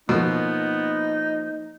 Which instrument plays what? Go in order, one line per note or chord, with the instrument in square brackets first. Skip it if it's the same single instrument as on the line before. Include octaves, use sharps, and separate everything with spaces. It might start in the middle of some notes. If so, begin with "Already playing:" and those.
[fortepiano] B2 [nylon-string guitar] F3 A#3 A#4 [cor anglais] B3 [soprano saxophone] D#4